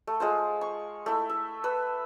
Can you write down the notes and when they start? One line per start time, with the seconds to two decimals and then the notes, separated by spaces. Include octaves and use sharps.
0.07 A3
0.20 G#3 F4 C5
0.61 C#6
1.06 A3 E4
1.29 E5
1.64 B4 E6